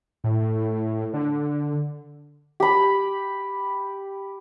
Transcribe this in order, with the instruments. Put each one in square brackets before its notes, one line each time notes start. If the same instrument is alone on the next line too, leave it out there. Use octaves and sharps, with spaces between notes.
[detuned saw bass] A2
D3
[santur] G4 B5